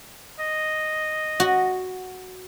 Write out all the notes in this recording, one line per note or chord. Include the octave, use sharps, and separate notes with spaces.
D#5
F#4